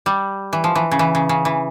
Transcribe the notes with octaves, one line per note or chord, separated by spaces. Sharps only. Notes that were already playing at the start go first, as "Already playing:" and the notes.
G3
E3
F3
E3
C#3
E3
C#3
C#3
E3